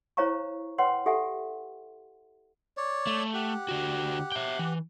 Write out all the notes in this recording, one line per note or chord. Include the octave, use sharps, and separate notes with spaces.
E4 C5 C#5 F5 A#5 C#6
B4 C#5 F#5 G5 C6
G4 A4 E5 F#5 G#5
C#5 D5
A3
G4 F#5
D3 F#4
E5 G5
E3